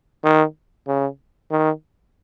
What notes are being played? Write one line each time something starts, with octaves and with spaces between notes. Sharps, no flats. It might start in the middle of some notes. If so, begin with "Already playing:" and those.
D#3
C#3
D#3